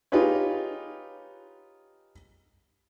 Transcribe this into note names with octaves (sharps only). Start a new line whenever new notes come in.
D#4 F4 G4 G#4 B4 C#5